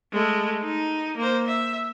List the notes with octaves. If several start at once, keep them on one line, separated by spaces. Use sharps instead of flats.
G#3 A3
D#4
A#3 C5
E5